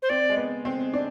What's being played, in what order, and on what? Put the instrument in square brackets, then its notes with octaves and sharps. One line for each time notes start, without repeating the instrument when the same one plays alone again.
[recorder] C5
[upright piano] C4 [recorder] D5
[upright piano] G#3
B3
C4
D4